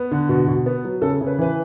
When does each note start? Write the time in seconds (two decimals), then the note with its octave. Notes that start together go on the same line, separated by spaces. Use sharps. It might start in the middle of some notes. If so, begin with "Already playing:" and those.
Already playing: B3
0.11 D3
0.29 B2
0.47 B2
0.66 B3
0.84 F#3
1.02 C#3 A4
1.21 C#3
1.27 B4
1.39 E3 B4